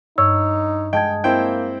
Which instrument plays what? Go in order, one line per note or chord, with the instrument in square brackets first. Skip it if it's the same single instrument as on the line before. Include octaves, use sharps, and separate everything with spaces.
[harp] G2 [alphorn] D#4 [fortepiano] C#5 [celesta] E6
[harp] G#3 [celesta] D#5 A5 G#6 [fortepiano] G5
[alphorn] A#3 [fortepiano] C4 E4 G5